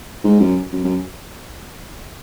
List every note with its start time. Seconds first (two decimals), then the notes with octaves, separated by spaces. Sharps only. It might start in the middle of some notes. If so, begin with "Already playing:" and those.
0.24 G#2
0.41 F#2
0.73 F#2
0.84 F#2